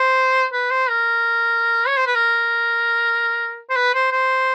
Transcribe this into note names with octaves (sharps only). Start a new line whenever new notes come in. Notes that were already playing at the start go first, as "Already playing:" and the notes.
Already playing: C5
B4
C5
A#4
C#5
C5
B4
A#4
C5
B4
C5
C5